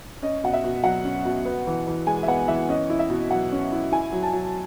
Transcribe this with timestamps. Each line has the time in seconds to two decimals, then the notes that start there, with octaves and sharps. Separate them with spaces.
0.22 C#4 D#5
0.44 B2 F#5
0.54 E5
0.64 B2
0.84 F#3 F#5
1.04 C#4
1.25 B2
1.45 B3
1.67 E3
1.87 E3
2.07 G#3 G#5
2.23 E5
2.27 B3 F#5
2.48 E3 E5
2.69 C#4 D#5
2.90 E4
2.99 E5
3.10 B2
3.31 F#3 F#5
3.52 C#4
3.72 E4
3.92 E4 G#5
4.13 F#3
4.23 A5
4.33 F#3